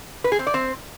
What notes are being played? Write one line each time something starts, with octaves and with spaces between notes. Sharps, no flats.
B4
G#4
C4
D5
C4